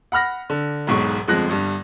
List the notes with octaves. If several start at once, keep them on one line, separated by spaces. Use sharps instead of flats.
F#5 B5 F6 A#6
D3
E1 B1 G#2 C#6
G1 F2 F3 G#3 F#6 A#6
G1 G2